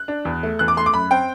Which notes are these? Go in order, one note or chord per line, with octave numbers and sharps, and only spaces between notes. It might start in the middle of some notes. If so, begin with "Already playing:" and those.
Already playing: F#6
D4
E2
A3
E2 F#6
D6
A3 C6
D6
F#2 B5
C4 G5